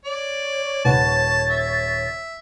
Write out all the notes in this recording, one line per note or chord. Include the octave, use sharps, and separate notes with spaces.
C#5 D5
D#1 B4 F#5 A5 A6
E5